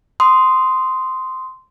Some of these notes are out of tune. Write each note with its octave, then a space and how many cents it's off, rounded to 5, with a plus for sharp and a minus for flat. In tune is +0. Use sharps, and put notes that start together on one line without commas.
C6 -10 D#6 +0